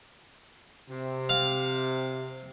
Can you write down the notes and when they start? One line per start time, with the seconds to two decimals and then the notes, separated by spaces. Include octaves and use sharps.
0.90 C3
1.29 F5